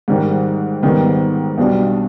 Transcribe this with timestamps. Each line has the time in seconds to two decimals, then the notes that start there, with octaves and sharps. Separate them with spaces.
0.08 G#2 D#3 G3
0.83 G#2 D#3 G3 B3
1.58 B1 B2 G3 D4